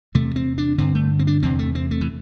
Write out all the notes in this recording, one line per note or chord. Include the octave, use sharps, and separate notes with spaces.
E2 C3 A3
C4
D4
G2 D3 C4
A3
C4
D4
E2 C3 C4
A3
C4
A3
E3